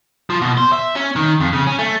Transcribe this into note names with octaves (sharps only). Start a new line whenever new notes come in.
F3
B2
C5
E5
C#4
D#3
F2
C#3
C#4
A3